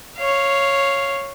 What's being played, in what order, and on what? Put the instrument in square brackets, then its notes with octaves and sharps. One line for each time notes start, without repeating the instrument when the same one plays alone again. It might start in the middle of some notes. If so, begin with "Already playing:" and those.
[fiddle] C#5 F5